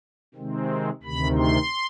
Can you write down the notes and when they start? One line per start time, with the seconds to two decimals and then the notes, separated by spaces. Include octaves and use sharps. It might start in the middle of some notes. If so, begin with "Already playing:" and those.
0.35 C3 D#3 G#3 C4
1.03 D2 C3 D#3 B5
1.38 C6